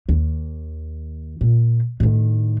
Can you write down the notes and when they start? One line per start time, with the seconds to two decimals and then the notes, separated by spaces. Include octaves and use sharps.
0.09 D#2
1.41 A#2
2.00 A2 D#3